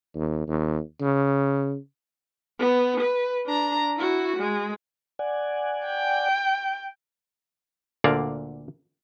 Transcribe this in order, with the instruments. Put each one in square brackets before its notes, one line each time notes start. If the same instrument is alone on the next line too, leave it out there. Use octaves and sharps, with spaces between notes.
[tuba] D#2
D#2
C#3
[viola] B3
B4
D4 A#5
E4 F#4
G#3
[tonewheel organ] D5 F#5 G#5
[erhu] G5
[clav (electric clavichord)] D2 A#2 D3 A#3 D5 F5